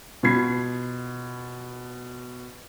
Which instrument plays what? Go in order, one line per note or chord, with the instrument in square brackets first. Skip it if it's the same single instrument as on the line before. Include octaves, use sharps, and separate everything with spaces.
[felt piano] B2 F4 B5 G#6 C7